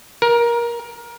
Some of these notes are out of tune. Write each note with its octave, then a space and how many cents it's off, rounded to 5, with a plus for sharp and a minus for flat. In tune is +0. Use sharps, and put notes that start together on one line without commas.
A#4 +20